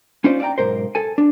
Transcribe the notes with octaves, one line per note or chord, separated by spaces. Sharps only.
C#4 D#4 F4 C5 D5
D5 E5 F5 G5 A#5
B1 G#2 A#4 C5
A4 G#5
D4